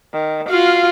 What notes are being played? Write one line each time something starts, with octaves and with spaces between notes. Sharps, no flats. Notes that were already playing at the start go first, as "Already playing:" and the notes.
D#3
F4 F#4 F5